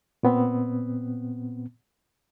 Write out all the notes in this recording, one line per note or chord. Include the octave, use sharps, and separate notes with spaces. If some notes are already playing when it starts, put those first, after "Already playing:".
A#2 B3 C4